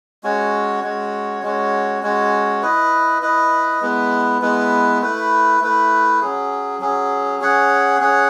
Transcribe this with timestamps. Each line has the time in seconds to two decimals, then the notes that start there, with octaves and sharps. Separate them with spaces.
0.23 G#3 C#4 F#4 C#5
0.83 G#3 C#4 F#4 C#5
1.43 G#3 C#4 F#4 C#5
2.03 G#3 C#4 F#4 C#5
2.62 E4 B4 D#5
3.22 E4 B4 D#5
3.81 G#3 B3 E4 B4
4.42 G#3 B3 E4 B4
5.01 A3 E4 B4
5.61 A3 E4 B4
6.21 F#3 C#4 G#4
6.80 F#3 C#4 G#4
7.40 C#4 G#4 C#5 F#5
8.00 C#4 G#4 C#5 F#5